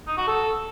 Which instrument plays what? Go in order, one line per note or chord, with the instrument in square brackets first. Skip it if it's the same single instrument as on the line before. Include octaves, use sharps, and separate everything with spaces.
[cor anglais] D#4
F#4
A4